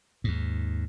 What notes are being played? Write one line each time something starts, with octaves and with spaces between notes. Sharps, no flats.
D#2 G#2